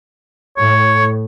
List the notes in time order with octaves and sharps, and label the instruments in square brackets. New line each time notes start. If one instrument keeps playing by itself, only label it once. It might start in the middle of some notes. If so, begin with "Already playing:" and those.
[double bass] A2 A3 [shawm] C#5